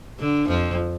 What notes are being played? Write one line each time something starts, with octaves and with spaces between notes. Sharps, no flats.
D3
F2 F3